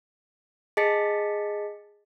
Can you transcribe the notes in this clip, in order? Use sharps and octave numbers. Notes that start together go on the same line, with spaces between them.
G#4 D#5 A5 A6 B6 C#7